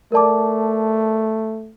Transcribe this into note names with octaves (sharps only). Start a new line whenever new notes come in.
A3 A#4 D5 A5 D6